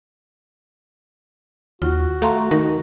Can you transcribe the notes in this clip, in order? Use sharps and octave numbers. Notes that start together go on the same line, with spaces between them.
D#2 F4 F#4
A3 F5 A#5 C6
D#3 A#4